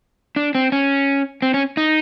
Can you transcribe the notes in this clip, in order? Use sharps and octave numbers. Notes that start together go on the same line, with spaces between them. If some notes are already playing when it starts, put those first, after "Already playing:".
D4
C4
C#4
C4
C#4
D#4